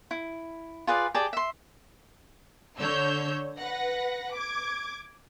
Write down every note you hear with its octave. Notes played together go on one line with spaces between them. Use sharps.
E4
F4 G#4 B4 D5
G4 G#4 D5 A5
E5 C6
D3 C#5 E6 G6
B4 F#5 A#6
D6 G#6